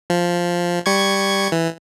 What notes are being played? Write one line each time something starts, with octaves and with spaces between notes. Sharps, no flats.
F3
G3 C#6 G#6
E3